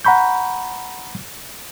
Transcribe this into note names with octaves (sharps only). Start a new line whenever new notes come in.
F#5 A#5 B5 C#6 G6